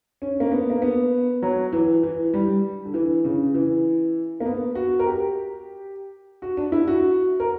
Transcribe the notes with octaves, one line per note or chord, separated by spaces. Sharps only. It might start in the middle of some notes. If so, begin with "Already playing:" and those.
C#4
A#3
B3
A#3
B3
F#3
E3
E3
G3
D3
E3
C#3
E3
A#3
B3
F#4
A#4
G4
F#4
D4
E4
F#4
A#4